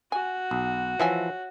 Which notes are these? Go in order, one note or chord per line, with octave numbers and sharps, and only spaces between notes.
F#4 G#5
B1
E3 F3 C#5 E5 G#5